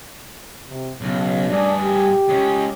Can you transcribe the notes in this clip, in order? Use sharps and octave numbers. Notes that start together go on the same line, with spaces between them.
C3
B1 C#3
G2 D4 G#4
G4
G#3 C#4